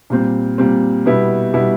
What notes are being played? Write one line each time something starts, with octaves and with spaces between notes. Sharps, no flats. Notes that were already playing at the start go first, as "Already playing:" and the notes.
A#2 G3 C4
A#2 G3 C4
B2 G3 B3 E4
B2 G3 B3 E4